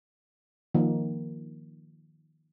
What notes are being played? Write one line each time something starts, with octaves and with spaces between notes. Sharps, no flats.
D#3 F3 A#3